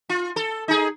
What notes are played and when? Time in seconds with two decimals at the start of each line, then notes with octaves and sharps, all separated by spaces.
0.09 F4
0.36 A4
0.68 D#4 G#4